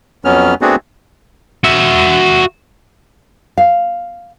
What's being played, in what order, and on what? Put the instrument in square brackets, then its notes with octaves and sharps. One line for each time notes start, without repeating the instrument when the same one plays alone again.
[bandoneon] F2 F#3 B3 C#4 F6
A3 B3 C4 D4 F#4 G#4
[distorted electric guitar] F#4 E5
[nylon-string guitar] F5